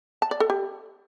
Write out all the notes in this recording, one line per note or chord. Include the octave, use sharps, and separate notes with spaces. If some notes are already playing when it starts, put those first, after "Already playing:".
A5
D5
A4
G4